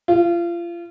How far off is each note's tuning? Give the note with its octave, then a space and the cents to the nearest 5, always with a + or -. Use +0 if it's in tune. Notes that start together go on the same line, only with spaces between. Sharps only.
F4 -30